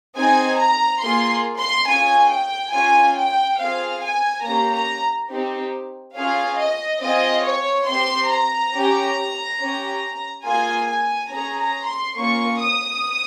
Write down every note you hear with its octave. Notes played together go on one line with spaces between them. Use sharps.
C4 D#4 G#4 G#5
A#5
A#3 F4 G#4 C6
C6
C#4 F4 G#4 G#5
G5
C#4 F4 G#4 G#5
G5
C4 F4 G#4 F5
G#5
A#3 C#4 G4 A#5
A#5
C4 D#4 G4
C#4 F4 G#4 F5
D#5
C4 F4 G#4 D#5
C#5
C4 G4 C6
A#5
C#4 G4
C#4 G4
A#3 F4 G#4 G#5
G#5
C#4 G#4 A#5
A#5
C6
A#3 C#4 F4 C#6
D#6